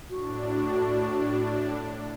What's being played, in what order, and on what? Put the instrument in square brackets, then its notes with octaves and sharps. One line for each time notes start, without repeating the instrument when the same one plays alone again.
[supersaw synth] A2 D4 [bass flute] F#4